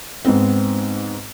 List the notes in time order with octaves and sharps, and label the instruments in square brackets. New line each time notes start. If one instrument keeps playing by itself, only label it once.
[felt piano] G#2 B3 C4